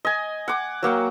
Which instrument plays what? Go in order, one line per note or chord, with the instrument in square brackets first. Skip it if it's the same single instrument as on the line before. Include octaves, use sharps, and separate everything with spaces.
[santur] D#5 G#5
F#5 D6
F#3 A#3 F#5 G5